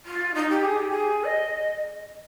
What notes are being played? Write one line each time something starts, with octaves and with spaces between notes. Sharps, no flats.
F4
D#4
G4
G#4
G4
G#4
D#5